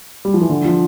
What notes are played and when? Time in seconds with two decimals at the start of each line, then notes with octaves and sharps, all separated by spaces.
0.25 G3
0.34 F3
0.41 E3
0.49 D3
0.65 F3